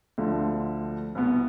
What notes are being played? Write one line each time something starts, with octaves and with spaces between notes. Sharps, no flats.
D2 D3 F3
C2 B2 B3